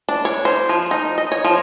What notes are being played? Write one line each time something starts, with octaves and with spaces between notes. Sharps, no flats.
D4
C#5
C5
F3
D#4
D#5
C#5
F3